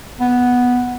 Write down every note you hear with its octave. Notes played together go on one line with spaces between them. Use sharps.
B3